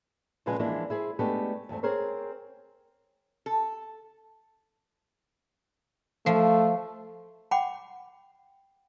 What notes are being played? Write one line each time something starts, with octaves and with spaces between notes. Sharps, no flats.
A#2 C#3 F3 G#3 B4 G#5
E3 F3 G#3 A#3 D4 E4
E4 G#4 C5
G#3 A3 B3 D4 G4
E2 G2 A3 C4
C4 G#4 A#4 C5 C#5
A4
F3 A3
F#5 G5 B5 D6